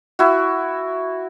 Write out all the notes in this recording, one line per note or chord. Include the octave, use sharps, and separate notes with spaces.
E4 F#4